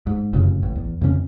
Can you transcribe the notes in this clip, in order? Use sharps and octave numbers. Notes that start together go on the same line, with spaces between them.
G#2
F1 F#2 A2 C#3
A1
E2
F2 C#3 E3 C#4